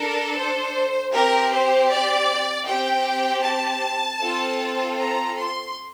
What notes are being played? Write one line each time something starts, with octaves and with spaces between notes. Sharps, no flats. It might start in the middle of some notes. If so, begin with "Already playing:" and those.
Already playing: D4 A4 A#4
C5
C4 G4 A#4
C5
D5
C4 G4 G5
A5
C4 F4 A4
A#5
C6